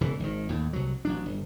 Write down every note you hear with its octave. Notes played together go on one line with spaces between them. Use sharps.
E1 C#3 E3
G#1 D#3
D#2 A2
C2 F#3
A1 F#3 D4
G1